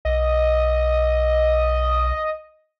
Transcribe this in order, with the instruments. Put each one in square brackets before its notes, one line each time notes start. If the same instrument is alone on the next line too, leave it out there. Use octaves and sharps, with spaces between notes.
[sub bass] B1 [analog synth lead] D#5